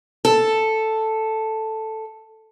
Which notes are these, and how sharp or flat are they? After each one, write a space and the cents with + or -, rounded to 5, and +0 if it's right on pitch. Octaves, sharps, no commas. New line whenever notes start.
A4 +0